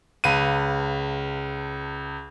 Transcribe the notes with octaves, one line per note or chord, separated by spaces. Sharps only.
C#2 B4 F5 D#7